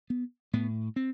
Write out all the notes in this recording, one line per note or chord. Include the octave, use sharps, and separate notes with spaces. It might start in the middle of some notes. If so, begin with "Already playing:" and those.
B3
A2 B3
C4